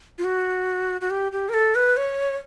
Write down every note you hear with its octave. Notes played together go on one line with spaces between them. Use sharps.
F4
F#4
F#4
G4
G4
A#4
A4
B4
C#5